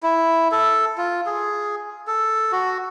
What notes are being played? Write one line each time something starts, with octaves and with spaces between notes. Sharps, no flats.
E4
A4
F4
G#4
A4
F#4